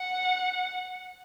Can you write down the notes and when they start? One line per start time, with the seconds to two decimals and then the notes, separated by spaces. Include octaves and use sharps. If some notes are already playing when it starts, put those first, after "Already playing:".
Already playing: F#5